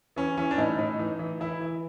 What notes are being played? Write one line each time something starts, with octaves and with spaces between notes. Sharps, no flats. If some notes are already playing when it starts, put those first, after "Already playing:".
E3 C#4
E3 C#4
D4
A2 D#4
A2 D#4
E3
E3
E3 E4
E3